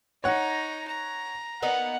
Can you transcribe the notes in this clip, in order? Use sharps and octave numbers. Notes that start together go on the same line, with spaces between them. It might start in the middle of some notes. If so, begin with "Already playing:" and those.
D#4 C#5 F#5 A#5
A#5
A#3 B3 D#4 F#5